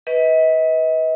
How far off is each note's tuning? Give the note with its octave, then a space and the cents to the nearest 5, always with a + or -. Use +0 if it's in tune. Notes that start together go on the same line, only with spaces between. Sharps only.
B4 +0 D#5 +40